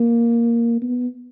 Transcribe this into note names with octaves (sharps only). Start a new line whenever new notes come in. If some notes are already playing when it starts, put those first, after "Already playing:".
Already playing: A#3
B3